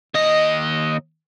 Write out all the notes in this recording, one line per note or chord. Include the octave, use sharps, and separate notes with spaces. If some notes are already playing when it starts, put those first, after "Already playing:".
D#2 D#5